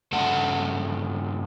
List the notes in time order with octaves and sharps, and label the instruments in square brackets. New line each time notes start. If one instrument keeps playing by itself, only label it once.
[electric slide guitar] G2 C#3 A4 E5 F#5 A5